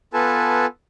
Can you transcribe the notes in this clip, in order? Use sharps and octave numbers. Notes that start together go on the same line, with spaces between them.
B3 F4 A4 B4 G#5 A5